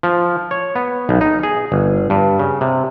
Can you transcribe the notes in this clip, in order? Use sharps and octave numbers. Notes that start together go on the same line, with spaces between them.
F3
C#5
B3
B1
D#4
G#4
G1
G2
C#3
C3